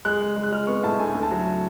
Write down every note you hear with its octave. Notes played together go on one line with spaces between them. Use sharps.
G#3 F#6
G#3
G#3
F#6
G#3 F6
B3 C#6
A2 A5
D2 G#5
D2
A5
F#3